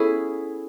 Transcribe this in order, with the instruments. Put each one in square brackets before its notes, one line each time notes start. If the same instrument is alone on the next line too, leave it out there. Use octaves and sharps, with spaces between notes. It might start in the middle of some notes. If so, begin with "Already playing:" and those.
Already playing: [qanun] B3 C#4 E4 G#4 [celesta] A4